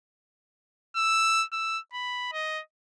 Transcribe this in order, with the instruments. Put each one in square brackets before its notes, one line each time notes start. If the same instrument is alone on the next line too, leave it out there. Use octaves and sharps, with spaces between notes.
[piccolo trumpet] E6
E6
B5
D#5